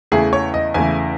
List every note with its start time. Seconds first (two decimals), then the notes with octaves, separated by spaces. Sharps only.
0.12 E2 C#3 E3 A3 G#4
0.33 C#5
0.54 D#5
0.74 E2 C#3 E3 A3 G#5